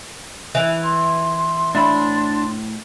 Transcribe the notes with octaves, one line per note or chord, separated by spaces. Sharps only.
E3
C6
A2 D4 E5 B5